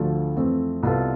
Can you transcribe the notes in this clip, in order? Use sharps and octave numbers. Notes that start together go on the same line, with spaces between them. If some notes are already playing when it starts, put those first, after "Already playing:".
Already playing: D2 D3 F3 A3
F2 E3 A3 C4
C2 B2 B3 F4 A4